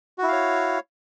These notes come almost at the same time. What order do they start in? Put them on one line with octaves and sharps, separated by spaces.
F#4 E4 F5 C#5